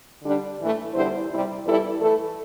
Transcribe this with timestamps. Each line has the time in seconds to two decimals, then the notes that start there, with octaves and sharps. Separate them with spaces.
0.23 D3 G3 D4
0.59 A2 E3 A3
0.94 E2 D3 G3 E4 C5
1.29 C3 G3 E4
1.64 E2 E3 G3 E4 A4
2.00 E3 A3 E4 A4